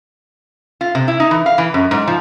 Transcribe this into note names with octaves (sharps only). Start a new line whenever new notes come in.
F4
C3
E4
D#4
E3
F5
E3
F#2
G#2
F3